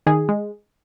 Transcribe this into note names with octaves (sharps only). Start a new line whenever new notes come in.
D#3 G#4
G#3